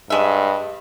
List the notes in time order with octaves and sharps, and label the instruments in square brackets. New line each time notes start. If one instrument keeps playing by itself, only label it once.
[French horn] G2 [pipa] G#3 E5